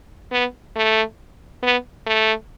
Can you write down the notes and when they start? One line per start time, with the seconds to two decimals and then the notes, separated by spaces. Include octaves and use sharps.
0.32 B3
0.76 A3
1.63 B3
2.07 A3